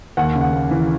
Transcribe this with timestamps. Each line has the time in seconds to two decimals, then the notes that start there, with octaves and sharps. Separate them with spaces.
0.17 D#2 F#5
0.35 C#3
0.41 F#5
0.53 A#3
0.71 E3